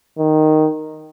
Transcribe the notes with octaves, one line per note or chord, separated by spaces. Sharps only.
D#3